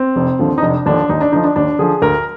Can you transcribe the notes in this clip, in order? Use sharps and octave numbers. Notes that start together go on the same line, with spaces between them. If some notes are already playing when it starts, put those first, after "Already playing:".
Already playing: C4
F1
D#2 D3 F3
D#4
F1 D4
D#2 D3 F3 D4
D#2 D#4
D4
D3 F3 D#4
D4
D#2 D4
D3 F3 G#4
D2 A#4